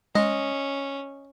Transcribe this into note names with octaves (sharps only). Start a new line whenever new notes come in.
G#3 C#4 D#5